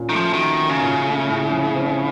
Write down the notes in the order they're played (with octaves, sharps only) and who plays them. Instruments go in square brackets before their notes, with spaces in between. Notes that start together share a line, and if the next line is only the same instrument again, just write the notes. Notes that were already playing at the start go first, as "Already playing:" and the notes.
Already playing: [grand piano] A#2 C#4
[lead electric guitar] D#3 [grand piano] A3
[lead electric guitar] F3
[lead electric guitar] D#3 [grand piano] F#4
[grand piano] C#4
[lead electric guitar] C#3
[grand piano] A#2
A3
A2
F3
C4